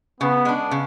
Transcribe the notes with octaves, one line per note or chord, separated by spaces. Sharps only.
C#3 B3
G#3 D4
C#3